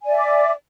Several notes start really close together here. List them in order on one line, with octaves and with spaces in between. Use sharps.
G#5 D5 E5 D6